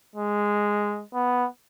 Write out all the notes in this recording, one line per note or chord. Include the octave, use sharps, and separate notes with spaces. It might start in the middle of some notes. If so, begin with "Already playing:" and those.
G#3
B3